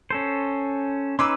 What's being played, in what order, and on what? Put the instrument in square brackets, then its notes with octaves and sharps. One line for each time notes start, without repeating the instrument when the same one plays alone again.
[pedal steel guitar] C#4 A4 C5
[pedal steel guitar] C#4 D#4 B4 [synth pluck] C6 D6 E6